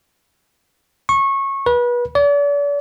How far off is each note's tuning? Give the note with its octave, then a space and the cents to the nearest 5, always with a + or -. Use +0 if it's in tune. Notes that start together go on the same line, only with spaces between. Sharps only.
C#6 -20
B4 -30
D5 -40